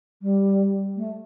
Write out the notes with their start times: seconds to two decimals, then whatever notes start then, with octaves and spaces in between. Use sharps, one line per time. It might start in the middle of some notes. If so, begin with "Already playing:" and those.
0.22 G3
0.97 A3